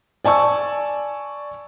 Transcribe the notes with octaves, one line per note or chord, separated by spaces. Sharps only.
D5 G#5 A5 C#6 E6